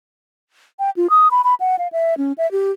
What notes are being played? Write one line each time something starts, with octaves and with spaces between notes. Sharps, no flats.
G5
F4
D#6
B5
B5
F#5
F5
E5
C#4
E5
G4